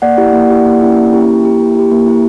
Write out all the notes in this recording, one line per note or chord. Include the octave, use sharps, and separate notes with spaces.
A#3 D5 F#5
E4 G4
A#3
E4 G4
A#3
C#4 E4 G4
A#3
C#4 E4 G4
A#3
E4 G4
A#3
E4 G4
A#3
E4 G4